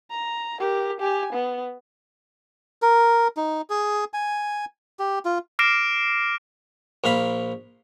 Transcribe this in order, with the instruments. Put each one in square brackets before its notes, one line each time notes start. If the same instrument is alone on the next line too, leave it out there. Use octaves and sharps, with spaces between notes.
[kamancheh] A#5
G4 A#4
G4 G#5
B3
[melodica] A#4
D#4
G#4
G#5
G4
F4
[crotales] D6 F6 A#6 C7 D7 E7
[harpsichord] A#1 A#3 F5 B5